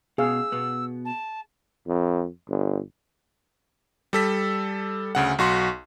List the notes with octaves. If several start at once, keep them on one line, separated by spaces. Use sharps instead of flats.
B2 G#4 F5 E6
B2 B3
A5
F2
G1
G3 A4 B6
D2 C#3 F#5
B1 F#4 C6 C#6